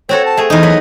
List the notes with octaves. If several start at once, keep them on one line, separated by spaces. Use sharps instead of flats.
C4 F#4 A4 C#5
A5
A3 G#4
E2 D#4 D#5
F#3 B4